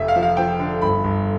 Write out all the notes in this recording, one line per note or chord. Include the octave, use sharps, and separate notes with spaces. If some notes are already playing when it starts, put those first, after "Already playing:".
Already playing: F1 E5
F5
F3
F5
F3 G5
D3
G1 B5
G1